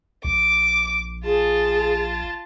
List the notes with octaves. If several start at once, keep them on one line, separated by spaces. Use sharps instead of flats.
A#1 D6
F4 G#4 A5